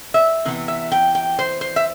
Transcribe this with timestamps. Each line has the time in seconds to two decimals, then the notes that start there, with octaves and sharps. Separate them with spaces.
0.14 E5
0.45 C3 E3 B3
0.68 E5
0.92 G5
1.15 G5
1.39 C5
1.61 C5
1.76 E5